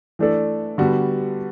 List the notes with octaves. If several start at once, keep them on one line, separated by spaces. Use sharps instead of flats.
E3 A3 D4 A4 D5
D3 G3 B3 F#4